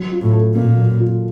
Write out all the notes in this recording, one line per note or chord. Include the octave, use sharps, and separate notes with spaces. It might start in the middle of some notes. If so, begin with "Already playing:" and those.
Already playing: F#3
F4
A2
A4
A#2 A#3
F#3
F4